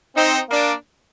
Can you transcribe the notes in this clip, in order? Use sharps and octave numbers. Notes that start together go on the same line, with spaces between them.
C4 D#4
A#3 D4